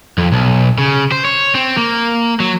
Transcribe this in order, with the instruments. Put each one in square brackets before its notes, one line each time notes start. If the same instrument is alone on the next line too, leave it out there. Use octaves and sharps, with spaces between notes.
[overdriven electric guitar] F2
B1
C#3
C5
C#5
C4
A#3
F#3